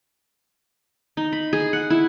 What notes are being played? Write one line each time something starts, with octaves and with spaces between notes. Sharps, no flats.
D#4
B5
G#4
F#5
E4